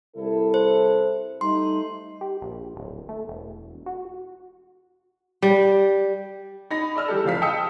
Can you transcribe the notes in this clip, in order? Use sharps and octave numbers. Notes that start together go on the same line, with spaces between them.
C2 E4 A4
C5
G3 A3 D#4 C6
G4
A#1
D1
A3
E1
F#4
G3
D#4 B5 A#6
D5 D#5 E6 F6
E3 G3 G4 A4
F1 C#2 F3 F5 B6
D#5 G5 A5 D#6 E6 C#7